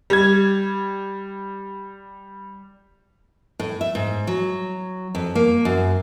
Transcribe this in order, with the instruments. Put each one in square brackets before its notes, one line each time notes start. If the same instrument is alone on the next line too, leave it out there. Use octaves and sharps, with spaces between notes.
[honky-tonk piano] G3 G#6
[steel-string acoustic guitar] A2
E5
G#2
F#3
F2
A#3
F#2